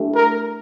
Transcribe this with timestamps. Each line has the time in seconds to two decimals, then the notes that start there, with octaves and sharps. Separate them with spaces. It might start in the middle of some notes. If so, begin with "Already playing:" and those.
Already playing: A3 D4 G4
0.15 A#4